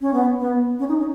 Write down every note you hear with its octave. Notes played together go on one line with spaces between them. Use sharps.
C#4
B3
B3
C#4
D#4
C#4